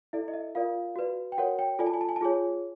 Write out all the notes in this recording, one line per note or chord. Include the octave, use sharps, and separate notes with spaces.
E4 A4 D5 E5
D#5
E5
F4 A#4 D5 F5
F#4 B4 D5
G5
F#4 A#4 C#5 F#5
G5
F4 A4 D5 G#5
A5
G#5
A5
G#5
A5
F4 G#4 C#5 G#5